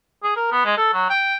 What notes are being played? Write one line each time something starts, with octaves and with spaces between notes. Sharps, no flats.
G#4
A#4
B3
G#3
A4
F#3
G5